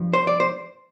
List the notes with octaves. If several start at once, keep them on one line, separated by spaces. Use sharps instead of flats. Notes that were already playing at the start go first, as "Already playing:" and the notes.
Already playing: G2 F3
C5
D5
C5